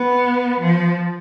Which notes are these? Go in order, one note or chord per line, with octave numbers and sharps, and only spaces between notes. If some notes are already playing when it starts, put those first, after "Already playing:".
Already playing: B3
F3